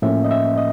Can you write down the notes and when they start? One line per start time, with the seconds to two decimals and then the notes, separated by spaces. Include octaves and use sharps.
0.02 A2 F3 A#3 C#4 E5
0.24 D#5
0.31 E5
0.58 D#5